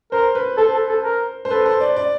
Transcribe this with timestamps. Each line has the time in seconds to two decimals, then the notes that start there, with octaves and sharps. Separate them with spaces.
0.12 A#4 C5
0.35 B4
0.57 A4 C5
0.74 A4
0.89 A4
1.03 A#4
1.45 C5
1.50 A4 B4
1.66 C5
1.81 D5
1.96 D5